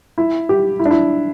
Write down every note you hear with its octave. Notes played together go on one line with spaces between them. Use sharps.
E4
G4
E4
D4
E4